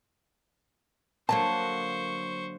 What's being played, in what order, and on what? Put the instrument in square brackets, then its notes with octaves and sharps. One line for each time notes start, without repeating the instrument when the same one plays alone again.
[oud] D3 F#3 A#3 [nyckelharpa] C5 C#6 [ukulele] A5